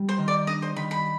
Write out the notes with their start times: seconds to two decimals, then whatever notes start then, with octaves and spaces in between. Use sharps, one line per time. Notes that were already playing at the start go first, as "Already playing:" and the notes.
Already playing: G3
0.09 C5
0.18 D#3
0.28 D5
0.47 D4 D#5
0.62 C5
0.76 D#3 B5
0.91 B5